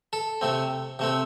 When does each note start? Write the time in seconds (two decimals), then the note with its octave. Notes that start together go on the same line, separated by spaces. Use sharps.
0.13 A4
0.41 C3 A3 C4
0.99 C3 A3 C4